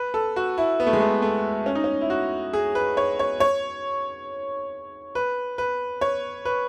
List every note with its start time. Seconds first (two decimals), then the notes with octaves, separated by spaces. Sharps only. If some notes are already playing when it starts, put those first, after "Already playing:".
Already playing: B4
0.14 A4
0.36 F#4
0.58 E4
0.80 B3
0.87 A3
0.93 G#3
1.00 A3
1.22 A3
1.66 C#4
1.75 D#4
1.84 C#4
2.01 E4
2.10 F#4
2.53 G#4
2.75 B4
2.97 C#5
3.19 C#5
3.40 C#5
5.15 B4
5.58 B4
6.01 C#5
6.45 B4